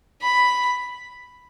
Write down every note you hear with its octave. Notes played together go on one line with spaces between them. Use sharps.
B5